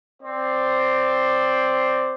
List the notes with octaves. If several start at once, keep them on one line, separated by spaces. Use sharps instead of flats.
C4 C5 D5